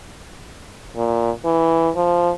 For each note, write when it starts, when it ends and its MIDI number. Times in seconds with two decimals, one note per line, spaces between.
0.96 1.31 46
1.45 1.90 52
1.96 2.31 53